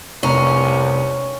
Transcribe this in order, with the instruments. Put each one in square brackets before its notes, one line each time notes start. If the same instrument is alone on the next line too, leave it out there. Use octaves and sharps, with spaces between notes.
[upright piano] F1 A#5 [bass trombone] C2 [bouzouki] C#4